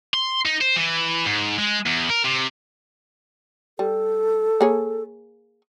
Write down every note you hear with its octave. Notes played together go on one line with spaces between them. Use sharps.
C6
D#4
C5
E3
G#2
G#3
E2
A#4
C3
G3 A4
A#3 G#4 C#5